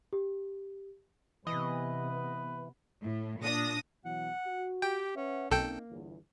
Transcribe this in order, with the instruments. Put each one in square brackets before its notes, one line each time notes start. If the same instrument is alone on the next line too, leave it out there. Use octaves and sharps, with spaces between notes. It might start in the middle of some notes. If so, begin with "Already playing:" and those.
[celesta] G4
[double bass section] C3 B3 [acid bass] E3 [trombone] B4 [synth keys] D#5
[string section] A2
A#2 D4 D#6 A#6
[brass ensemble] B2 E3 F#3 [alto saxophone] F#5
[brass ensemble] F#4
[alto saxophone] G4 [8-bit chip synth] G5
[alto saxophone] C#4 [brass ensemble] B4 E5 F#5
[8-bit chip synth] B1 A4 G5 [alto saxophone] A#3 [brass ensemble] C4 C#4 D#4
[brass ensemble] G1 E2